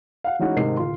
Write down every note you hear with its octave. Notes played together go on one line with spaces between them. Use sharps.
F5 F#5
E3 G#3 C#4 D#4 E4 F#4
G#2 C3 D#3 A#4 D#5 C7
D1 F4 C6